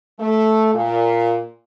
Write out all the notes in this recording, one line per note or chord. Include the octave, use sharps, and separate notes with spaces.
A3
A#2